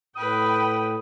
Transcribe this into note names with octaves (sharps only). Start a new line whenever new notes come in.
A2 B4 G5 D#6